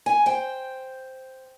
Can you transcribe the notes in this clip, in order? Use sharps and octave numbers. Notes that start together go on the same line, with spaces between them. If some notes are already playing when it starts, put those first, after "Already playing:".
G#5
C5 G5